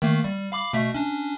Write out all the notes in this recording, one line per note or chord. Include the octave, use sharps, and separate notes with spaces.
D#3 A3 A#3
G3
F5 B5 D6
B2 A3 E5
C#4 D4